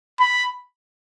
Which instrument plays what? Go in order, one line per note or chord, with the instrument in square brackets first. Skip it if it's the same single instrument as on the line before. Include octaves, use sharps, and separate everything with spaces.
[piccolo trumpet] B5